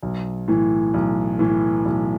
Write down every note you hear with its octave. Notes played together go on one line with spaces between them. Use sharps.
B1
A2 E3
B1
A2 E3
B1